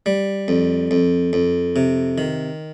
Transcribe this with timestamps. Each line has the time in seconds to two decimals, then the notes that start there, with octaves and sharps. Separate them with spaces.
0.06 G3
0.48 F2
0.91 F2
1.33 F2
1.76 C3
2.18 D#3